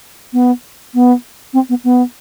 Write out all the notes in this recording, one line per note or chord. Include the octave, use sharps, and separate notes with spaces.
B3
B3
C4
B3
B3